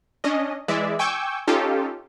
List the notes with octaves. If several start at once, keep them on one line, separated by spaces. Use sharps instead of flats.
C#4 D4 D#5
E3 G#3 D5 E5
G5 G#5 C#6 D6 E6 G6
C#4 D#4 F4 G4 A4